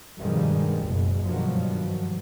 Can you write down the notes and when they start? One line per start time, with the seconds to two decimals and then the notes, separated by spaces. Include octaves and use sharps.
0.20 G2 B2 D#3 F3 G3 G#3
0.84 F#1 C#2 B2 G#3
1.24 G2 B2 D#3 F3 F#3